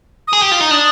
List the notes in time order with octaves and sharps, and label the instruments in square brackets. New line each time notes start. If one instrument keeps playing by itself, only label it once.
[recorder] D#6
[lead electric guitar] G#4
G4
F4
D#4
D4